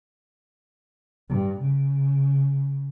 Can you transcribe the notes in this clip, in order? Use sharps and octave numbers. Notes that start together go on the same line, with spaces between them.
G2
C#3